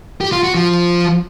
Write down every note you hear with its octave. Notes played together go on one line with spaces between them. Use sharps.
G4
F4
F#4
F3